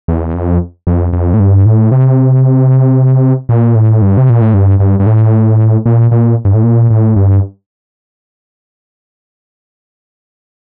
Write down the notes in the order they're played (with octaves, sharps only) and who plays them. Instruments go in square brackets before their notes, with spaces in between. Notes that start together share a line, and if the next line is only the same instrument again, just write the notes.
[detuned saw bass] E2
F2
F2
F2
A2
G2
A2
C3
A#2
A2
G2
C3
A#2
A2
G2
G2
G2
A2
A#2
A#2
G2
A2
A#2
A2
G2